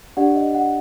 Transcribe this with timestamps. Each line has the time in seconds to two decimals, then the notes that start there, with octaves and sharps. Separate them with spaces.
0.17 D4 G4 D5 F#5
0.35 D#5
0.55 F#5